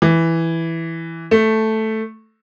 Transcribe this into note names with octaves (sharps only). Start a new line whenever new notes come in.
E3
A3